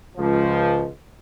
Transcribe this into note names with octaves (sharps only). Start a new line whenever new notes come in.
C#2 F3